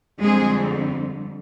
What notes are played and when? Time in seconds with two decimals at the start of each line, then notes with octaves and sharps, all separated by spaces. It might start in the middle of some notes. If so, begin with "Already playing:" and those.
0.21 F2 D3 G3 G#3 C4 G#4